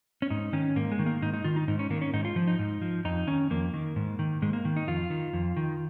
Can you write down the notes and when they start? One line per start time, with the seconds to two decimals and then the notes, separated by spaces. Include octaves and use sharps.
0.22 C#4
0.30 G#2 D#4
0.53 D#3 C#4
0.76 G#2 A#3
0.92 G#3
0.99 D#3
1.06 A#3
1.22 G#2 D#4
1.34 D#4
1.44 D#3 F4
1.56 D#4
1.68 G#2 D#4
1.79 C#4
1.90 D#3 A#3
2.02 C#4
2.13 G#2 D#4
2.25 F4
2.36 F3
2.48 D#4
2.59 G#2
2.82 F3
3.05 F2 D#4
3.27 D#3 C#4
3.50 F2 A#3
3.74 D#3
3.96 G#2
4.19 D#3
4.42 G#2 G#3
4.53 A#3
4.65 D#3
4.77 D#4
4.87 F2 F4
5.10 D#3
5.33 F2
5.57 D#3